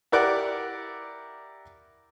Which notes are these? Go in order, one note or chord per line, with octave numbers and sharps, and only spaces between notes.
E4 G4 A#4 D5 F#5 D6